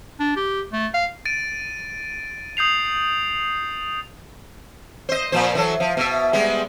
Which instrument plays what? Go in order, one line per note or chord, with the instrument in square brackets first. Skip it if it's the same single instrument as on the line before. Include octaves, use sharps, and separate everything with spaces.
[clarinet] D4
G4
A3
F5
[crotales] A6 D7 D#7
D#6 G6 C7 F7
[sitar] C5 D#5
A#2 F3 C5
E3 F#3 A4
F3
B2 E5
G3 G#3 B3